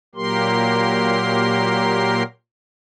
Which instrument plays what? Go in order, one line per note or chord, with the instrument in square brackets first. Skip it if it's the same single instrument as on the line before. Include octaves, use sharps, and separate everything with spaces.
[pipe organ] A#2 F#3 A#3 G4 A#4 C6